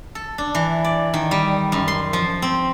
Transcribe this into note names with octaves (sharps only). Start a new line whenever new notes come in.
A4
D4
E3
D5
D#3
G3
F#2
C6
F3
C4